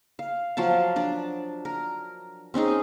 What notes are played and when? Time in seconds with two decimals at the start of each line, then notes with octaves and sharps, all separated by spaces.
0.19 F5
0.57 F3 F#3 F5 A5
0.96 D4 D5
1.65 A#4
2.54 C4 C#4 D#4 G#4